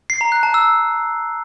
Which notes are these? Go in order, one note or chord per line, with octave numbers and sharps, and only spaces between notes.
C7
A#5
F#6
A5
E6